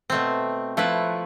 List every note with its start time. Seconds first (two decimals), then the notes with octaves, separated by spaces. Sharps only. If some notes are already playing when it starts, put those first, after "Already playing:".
0.10 B2 A3 C4
0.77 F3 A3 E4 B4